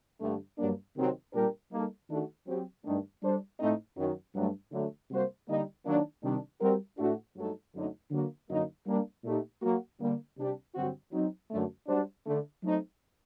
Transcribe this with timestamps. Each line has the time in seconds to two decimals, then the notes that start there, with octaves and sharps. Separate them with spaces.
0.21 G2 D3 A3
0.58 G2 F#3 A#3 D4
0.96 C3 D#3 F#3 C4
1.33 A#2 G3 D4 G4 A#4
1.72 G3 A#3 D#4 A4
2.08 D#3 A3 D4 F#4 A4
2.47 F#3 C4 G4
2.85 G2 D#3 A3 D4
3.22 G3 D4 A4 C5
3.59 A2 A3 C4 D#4
3.97 F#2 D#3 F#3
4.35 G2 F#3 A3
4.72 D3 F#3 A3
5.11 C3 G3 A#3 F#4 C5
5.48 D3 G3 A#3 D#4
5.85 D#3 F#3 A#3 D4
6.23 C3 D#3 G3 D4
6.61 G3 C4 F#4 A#4
6.98 A2 A3 D4 F#4
7.36 G2 F#3 A3 D#4 A4
7.74 F#2 D3 F#3 A3 D#4
8.11 D3 F#3 A#3 F#4
8.49 F#2 D3 F#3 A#3 D#4
8.86 G3 A#3 D4
9.24 A#2 A3 D#4 G4
9.62 F#3 A#3 F#4
10.00 D3 G3 A#3
10.37 C3 G3 D4 G4
10.75 G2 D3 F#3 C4 F#4
11.12 F#3 C4 D#4
11.50 F#2 D3 A3
11.88 G3 D4 F#4 C5
12.26 D3 A3 D4
12.63 F#3 A3 C4 D#4